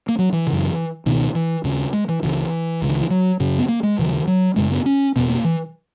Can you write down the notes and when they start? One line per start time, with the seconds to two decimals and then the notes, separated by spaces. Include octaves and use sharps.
0.08 A#3
0.19 F#3
0.33 E3
0.47 C#3
0.52 F#2
1.06 C#2 B2 D#3
1.35 E3
1.64 D#2 C#3
1.93 G#3
2.09 E3
2.22 C#2 C#3 E3
2.82 C#2 C#3
2.89 D#3
3.01 E3
3.10 F#3
3.40 F#2 C#3
3.58 B3
3.68 A#3
3.83 G#3
3.99 D#2 C#3 E3
4.09 E3
4.12 D#3
4.27 F#3
4.56 F#2 C#3 G#3
4.71 B3
4.86 C#4
5.16 E2 B2 B3
5.29 A#3
5.44 E3